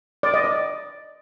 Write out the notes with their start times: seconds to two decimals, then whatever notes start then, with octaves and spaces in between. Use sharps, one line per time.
0.23 D5
0.34 D#5
0.44 D5